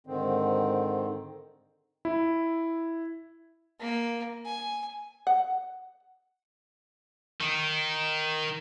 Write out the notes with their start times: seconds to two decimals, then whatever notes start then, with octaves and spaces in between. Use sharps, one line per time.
0.07 G#2 D3 D#3 C4
2.05 E4
3.80 A#3
4.46 G#5
5.27 F#5
7.41 D#3 D#4